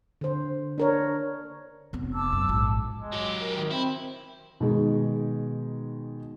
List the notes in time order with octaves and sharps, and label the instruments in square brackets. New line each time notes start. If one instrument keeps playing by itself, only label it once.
[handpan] D3 C5
D4 A#4 C#5
[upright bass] F1 B3
[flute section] A5 D6 E6
[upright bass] F#2
A#1 G#2
[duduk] G#3
[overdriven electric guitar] F#3 G4
[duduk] A#4
D#3
[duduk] C4 [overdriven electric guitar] E4
[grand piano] B2 D#3 G#3